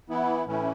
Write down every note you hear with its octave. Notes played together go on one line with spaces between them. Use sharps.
E3 B3 E4
A2 E3 A3 C#4 E4